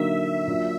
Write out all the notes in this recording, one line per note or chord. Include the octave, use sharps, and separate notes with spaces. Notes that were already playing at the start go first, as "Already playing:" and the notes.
Already playing: D3 F#3 A#3 D#4 F#4 E5
F#3 A#3 D4 F4